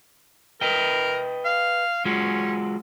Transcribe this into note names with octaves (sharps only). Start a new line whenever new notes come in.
A#4 B4 D#5 G5
F5
G#3 C#4 F4 F#4